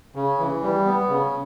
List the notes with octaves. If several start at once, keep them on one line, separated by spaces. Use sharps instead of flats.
C#3
E3
G3
B3
C#3